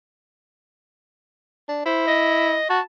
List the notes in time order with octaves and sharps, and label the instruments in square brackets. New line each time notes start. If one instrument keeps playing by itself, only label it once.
[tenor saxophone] D4
[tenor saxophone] E4 [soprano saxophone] C5
[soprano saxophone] D#5
[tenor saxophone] F#4 [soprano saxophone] A5